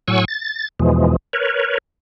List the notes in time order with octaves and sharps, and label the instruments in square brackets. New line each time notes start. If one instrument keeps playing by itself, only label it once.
[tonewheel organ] A2 F#3 F#5 G#5 C#6 E6
A6
E2 B2 E3 F3 G#3
A#4 B4 C#5